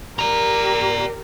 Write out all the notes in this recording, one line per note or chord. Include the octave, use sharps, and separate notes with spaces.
G4 A#4 D5 A#5